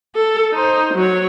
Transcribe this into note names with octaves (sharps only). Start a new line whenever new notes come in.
A4
D#4 C5
F#3 C#5